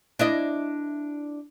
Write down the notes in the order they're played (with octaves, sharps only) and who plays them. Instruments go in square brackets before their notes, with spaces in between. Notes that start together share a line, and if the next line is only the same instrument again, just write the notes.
[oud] D4 E4 D#5